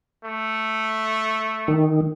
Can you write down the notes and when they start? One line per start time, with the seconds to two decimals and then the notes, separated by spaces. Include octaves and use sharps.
0.25 A3
1.68 D#3